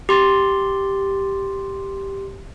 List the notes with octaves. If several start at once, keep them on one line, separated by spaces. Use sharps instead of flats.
G4 C6 A6